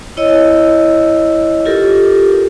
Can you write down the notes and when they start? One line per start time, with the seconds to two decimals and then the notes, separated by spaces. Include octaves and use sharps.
0.17 E4 C#5 D#5 E6
1.65 F4 G4 A4 A#4